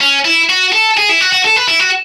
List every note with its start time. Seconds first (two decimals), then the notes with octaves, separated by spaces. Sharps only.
0.01 C#4
0.25 E4
0.49 F#4
0.73 A4
0.97 G#4
1.09 E4
1.21 F#4
1.33 F#4
1.45 A4
1.57 B4
1.69 E4
1.80 F#4